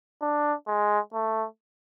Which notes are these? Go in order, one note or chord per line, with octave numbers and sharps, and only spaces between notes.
D4
G#3
A3